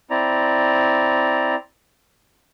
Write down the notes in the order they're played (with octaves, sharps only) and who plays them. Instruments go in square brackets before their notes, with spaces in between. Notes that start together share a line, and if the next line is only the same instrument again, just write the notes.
[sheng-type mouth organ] C4 E4 D5 A#5